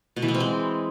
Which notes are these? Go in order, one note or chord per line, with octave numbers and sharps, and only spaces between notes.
B2
E3
B3
C4
G#3